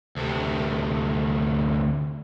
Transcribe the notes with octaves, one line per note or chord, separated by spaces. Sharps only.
D2 C3